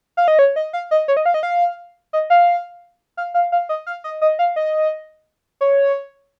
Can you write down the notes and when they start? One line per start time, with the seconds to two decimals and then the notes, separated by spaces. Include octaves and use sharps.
0.17 F5
0.28 D#5
0.39 C#5
0.56 D#5
0.73 F5
0.91 D#5
1.08 C#5
1.17 D#5
1.26 F5
1.34 D#5
1.43 F5
2.13 D#5
2.30 F5
3.17 F5
3.34 F5
3.52 F5
3.69 D#5
3.87 F5
4.04 D#5
4.22 D#5
4.39 F5
4.56 D#5
5.61 C#5